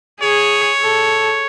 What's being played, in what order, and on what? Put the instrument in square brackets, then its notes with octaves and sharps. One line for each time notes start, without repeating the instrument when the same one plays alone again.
[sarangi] G#4 [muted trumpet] C#5
[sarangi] A4